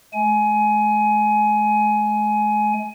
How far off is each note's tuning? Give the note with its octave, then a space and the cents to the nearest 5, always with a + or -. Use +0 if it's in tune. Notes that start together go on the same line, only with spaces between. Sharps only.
G#3 +40 G#5 +20